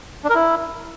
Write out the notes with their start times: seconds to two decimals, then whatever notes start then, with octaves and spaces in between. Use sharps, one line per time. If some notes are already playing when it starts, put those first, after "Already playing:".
0.24 D4
0.29 A#4
0.35 E4